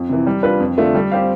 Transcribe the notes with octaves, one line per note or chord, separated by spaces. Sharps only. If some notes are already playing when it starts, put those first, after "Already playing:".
Already playing: F2
C3 E3
G3
D4 F4 B4
F2
D3 A3 D4 F4
G3
C4 G4 C5 F5